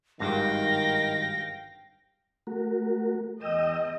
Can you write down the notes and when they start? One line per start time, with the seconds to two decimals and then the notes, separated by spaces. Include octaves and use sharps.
0.20 G#1 G2 D#3 F5 G5 A#6
2.47 A3 F#4 A#4
3.41 E2 D#5 G5 D#6 E6